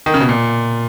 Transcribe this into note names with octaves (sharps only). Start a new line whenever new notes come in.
D#3
C#3
B2
A#2